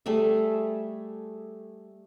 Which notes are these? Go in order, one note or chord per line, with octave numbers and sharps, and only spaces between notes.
G3 A3 G#4 E5